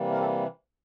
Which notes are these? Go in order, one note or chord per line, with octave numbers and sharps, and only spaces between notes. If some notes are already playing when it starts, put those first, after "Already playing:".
Already playing: C3 E3 G3 A#3
A#4
G4 A4